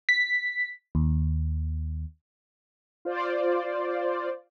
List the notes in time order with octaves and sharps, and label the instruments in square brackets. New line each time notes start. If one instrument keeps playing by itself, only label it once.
[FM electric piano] B6
D#2
[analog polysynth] F4 C5 D5